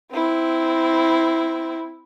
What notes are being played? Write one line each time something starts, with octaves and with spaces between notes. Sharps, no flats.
C4 E4